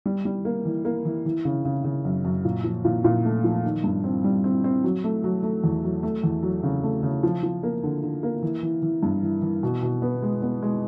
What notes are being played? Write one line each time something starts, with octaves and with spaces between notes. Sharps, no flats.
G3
G3
A#3
E3
A#3
E3
E3
C#3
C#3
C#3
F#2
F#2
A#2
F3
A#2
A#2
A3
F3
D#3
G2
C4
G3
C4
C4
F#3
A3
F#3
A3
E2
F#3
A3
E2
F#3
C#3
A3
C#3
F3
F3
A#3
D3
D3
A#3
E3
E3
E3
G2
E3
E3
B2
B2
B3
G#3
B3
G#3